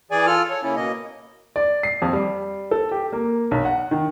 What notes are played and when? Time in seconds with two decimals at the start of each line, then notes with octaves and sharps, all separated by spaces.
0.11 E3 G#4 D5 G#5
0.26 F4 A4 F6
0.50 A4 C#5
0.63 C#3 A#3 C#4 E4
0.76 B2 A#3 D#5
1.56 D5
1.83 C7
2.02 F2
2.13 G3
2.71 A4
2.91 G4
3.12 A#3
3.51 B1
3.65 F#5
3.91 D#3